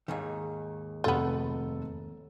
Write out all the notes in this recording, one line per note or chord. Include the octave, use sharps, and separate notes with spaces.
D#2 G#2 D#3
F1 B3 F4 A4